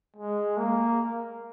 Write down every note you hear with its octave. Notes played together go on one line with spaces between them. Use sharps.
G#3
A#3